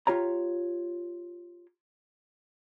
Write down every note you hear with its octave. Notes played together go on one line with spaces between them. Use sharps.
F4 G4 C#5 A#5